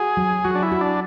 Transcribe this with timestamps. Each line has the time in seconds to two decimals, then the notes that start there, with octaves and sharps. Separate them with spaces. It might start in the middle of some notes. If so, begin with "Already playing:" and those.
Already playing: F#4 G#4
0.17 F#3
0.44 F#3 F#4
0.55 D4
0.63 E4
0.72 F#4
0.81 D4